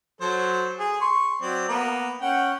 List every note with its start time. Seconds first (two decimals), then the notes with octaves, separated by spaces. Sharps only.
0.21 F#3 A4 C5
0.79 G#4
1.01 C6 C#6
1.41 F#3 C4 D5
1.69 A#3 B3 A#4
2.21 C#4 F#5 G5